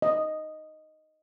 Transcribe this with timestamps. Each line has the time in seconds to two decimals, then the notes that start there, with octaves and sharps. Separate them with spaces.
0.02 D#5